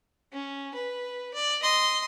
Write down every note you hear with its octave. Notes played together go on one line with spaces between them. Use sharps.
C#4
B4
D5
D#5 C6